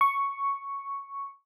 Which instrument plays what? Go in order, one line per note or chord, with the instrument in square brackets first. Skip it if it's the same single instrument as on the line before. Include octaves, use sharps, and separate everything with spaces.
[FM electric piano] C#6